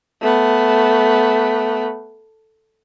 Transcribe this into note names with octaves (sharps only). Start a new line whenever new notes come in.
A3 B3